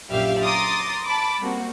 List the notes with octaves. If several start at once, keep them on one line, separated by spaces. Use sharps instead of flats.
A#1 F#2 G3 G4 E5 F5
A#5 C6 D6 D#6 A6
A5 B5 D6
G3 A#3 C4 F#4